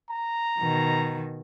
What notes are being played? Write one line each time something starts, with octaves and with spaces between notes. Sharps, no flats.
A#5
B2 D#3